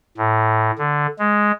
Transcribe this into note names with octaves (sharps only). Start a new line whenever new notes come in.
A2
D3
G#3